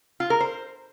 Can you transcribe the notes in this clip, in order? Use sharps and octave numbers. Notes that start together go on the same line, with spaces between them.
F4
A#4
C5